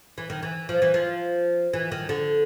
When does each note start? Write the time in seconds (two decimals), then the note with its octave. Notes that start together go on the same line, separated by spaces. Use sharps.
0.18 E3
0.30 D#3
0.43 E3
0.69 F3
0.82 E3
0.94 F3
1.74 E3
1.92 D#3
2.09 D3